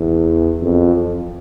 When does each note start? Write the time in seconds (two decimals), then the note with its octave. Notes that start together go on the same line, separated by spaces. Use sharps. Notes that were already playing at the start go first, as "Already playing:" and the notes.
Already playing: E2
0.62 F2